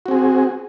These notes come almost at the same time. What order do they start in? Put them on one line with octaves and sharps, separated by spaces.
F#4 C4 G#4